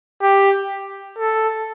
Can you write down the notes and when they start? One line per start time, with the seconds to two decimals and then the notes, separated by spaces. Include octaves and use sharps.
0.22 G4
1.19 A4